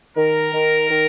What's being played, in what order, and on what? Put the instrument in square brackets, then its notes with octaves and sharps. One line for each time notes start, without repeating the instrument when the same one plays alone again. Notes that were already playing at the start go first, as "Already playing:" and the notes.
[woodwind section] D#3 [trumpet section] A#4
[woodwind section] D#3
D#3